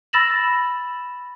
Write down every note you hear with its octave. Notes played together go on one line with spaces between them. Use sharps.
B5 E6 A6 A#6 E7 F#7